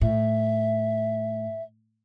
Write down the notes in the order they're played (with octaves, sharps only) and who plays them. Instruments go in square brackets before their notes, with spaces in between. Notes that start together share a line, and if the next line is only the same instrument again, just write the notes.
[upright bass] A2 [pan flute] E5